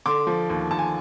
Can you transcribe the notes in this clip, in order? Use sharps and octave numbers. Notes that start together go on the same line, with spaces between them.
D3 C6 D6
F3
D#2
D#2 A5
G#5